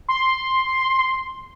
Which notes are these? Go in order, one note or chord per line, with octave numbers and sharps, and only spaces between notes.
C6